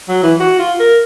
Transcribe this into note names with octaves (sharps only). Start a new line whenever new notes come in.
F#3
E3
F#4
F4
A#4